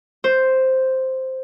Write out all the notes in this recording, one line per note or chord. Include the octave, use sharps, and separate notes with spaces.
C5